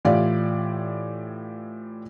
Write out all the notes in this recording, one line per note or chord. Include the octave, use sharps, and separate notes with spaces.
A2 E3 F4 G4 D5 F5